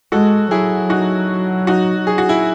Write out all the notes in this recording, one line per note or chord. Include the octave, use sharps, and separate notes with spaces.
G#3 F#4 A4
F#3 E4 G#4
D#4 F#4
D#4 F#4
G#4
F#4
E4 G#4